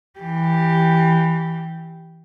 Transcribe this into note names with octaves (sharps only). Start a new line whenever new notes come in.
E3 G4